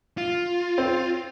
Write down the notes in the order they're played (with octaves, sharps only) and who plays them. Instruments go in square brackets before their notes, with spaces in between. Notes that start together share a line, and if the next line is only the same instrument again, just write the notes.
[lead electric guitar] F4
[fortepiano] C4